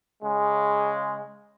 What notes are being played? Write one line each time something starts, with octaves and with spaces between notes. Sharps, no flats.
C#3 G#3